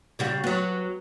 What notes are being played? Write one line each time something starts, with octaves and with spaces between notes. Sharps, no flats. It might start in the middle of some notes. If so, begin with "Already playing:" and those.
C#3 G3 F#4
F#3 B3